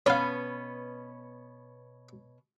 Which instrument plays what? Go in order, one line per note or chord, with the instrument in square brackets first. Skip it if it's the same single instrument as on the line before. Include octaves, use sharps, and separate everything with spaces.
[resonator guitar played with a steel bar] B2 B3 C#4 [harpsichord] C#5 F5